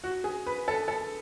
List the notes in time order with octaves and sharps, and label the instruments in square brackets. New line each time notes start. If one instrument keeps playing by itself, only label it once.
[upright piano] F#4
G#4
B4
A4
A4